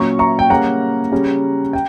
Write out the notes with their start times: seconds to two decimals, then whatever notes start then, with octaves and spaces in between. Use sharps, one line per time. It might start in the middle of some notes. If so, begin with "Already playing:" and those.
Already playing: A#2 F#3 C#4 A#5 C#6
0.19 A#5 C#6
0.39 G5
0.50 C#3 G3 A#3 C#4 F#5 A#5
1.12 C#3 G3 C#4
1.73 G5